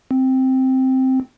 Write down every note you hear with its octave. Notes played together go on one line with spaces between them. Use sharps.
C4